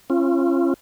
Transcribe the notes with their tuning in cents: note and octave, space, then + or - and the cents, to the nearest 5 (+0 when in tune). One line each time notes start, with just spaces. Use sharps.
C#4 -35 F4 -35